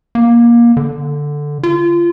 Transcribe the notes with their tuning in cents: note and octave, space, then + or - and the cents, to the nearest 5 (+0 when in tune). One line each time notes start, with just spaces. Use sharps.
A#3 +20
D3 +0
F4 -25